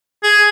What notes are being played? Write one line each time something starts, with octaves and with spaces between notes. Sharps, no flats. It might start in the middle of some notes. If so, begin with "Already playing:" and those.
G#4